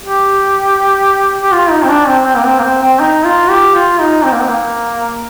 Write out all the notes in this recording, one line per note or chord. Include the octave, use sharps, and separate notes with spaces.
G4
G4
F4
D#4
C4
D4
C4
C4
A#3
C4
A#3
C4
C4
D#4
F4
G4
F4
D#4
C4
A#3
C4
A#3